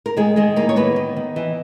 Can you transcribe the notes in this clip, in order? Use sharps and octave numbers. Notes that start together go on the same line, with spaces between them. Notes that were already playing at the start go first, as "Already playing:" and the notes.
A#4
D#3 G#3 G#4
D#3 G#3 G#4
A#3 E4 A#4
C#5
A#3 B3 B4
D#3
D#3
E3